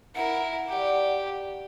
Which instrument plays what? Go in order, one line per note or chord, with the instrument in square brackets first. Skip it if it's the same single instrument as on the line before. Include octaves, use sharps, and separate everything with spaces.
[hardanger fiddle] E4 A#4 [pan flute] F#5
[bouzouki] G3 F#4 [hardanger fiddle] G4